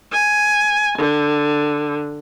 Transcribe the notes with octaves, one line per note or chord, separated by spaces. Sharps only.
G#5
D3